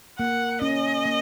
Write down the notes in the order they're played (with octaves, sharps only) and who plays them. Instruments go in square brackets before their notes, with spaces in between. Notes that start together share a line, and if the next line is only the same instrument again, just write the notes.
[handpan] A#3 [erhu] F#5
[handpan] C#4 [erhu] D#5
[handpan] A#3